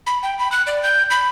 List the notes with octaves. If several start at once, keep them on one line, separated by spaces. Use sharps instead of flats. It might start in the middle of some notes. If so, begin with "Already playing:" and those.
B5
G5
B5
F#6
D5
G6
B5